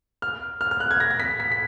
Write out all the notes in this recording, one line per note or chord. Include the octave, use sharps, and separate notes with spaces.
F6
F6
F6
F#6
G#6
A#6
A#6
B6
B6
B6